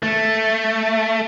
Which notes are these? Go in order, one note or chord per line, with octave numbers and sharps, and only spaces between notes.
A3